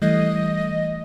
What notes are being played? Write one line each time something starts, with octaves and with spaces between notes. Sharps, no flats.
E3 G3 A3 D#5